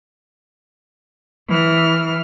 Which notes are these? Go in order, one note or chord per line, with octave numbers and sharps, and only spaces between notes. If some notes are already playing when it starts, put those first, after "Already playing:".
E3 F6